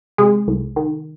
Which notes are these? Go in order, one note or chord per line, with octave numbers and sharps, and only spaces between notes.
C3 G#3
C2
D#3